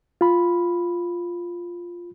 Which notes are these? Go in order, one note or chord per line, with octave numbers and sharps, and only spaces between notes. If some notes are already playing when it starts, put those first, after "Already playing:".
F4 B5